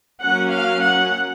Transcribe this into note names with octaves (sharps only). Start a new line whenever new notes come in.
F#3 A#3 C#4 F#5
F5
F#5